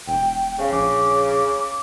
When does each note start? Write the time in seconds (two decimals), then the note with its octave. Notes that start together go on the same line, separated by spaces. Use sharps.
0.08 E1 G5
0.59 C#3 F5
0.72 A#1 D6